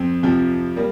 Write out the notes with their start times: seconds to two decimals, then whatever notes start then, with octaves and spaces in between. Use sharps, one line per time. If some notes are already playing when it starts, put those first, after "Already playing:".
Already playing: F2 C4
0.23 F2 C3 F3
0.76 G3 A#3